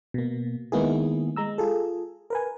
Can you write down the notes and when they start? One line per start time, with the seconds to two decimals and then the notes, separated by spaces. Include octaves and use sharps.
0.14 B2 A#3
0.72 D#3 G#3 A#3 B3 E4 G#4
1.36 G#3 A#5 E6
1.58 F4 G#4 A4
2.30 A#4 B4 G#5